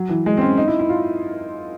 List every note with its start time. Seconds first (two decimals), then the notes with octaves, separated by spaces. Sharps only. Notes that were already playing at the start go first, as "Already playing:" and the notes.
Already playing: F#3
0.09 E3
0.26 G#3
0.37 C4
0.42 C#4
0.57 D#4
0.68 E4
0.79 E4
0.89 F4